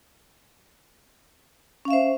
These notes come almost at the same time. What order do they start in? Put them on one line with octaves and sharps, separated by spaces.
C#4 F5 E5 C5